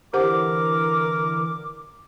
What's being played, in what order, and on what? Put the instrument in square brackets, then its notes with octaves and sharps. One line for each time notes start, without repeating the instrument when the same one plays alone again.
[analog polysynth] D3 E3 [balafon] G4 C5 F#5 [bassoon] A#4 [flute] D6